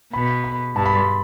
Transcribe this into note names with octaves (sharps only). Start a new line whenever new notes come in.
B2 B5
B5
G2 A5
B5
C6